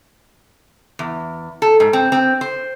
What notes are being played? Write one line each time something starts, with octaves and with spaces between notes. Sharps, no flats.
E2
A4
G#2
C4
C4
C5